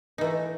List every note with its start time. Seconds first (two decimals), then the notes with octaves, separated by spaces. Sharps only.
0.18 D#4
0.21 E3
0.24 A3